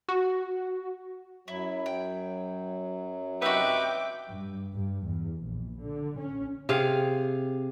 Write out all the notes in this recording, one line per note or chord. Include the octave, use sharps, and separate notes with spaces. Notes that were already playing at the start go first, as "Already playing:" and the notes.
F#4
F#2 F#3 E4
G5
C3 D#4 F#4 B4 E5 G5 D6
G2
G2
E2
A#1
D3
C#4
C3 G#4 F5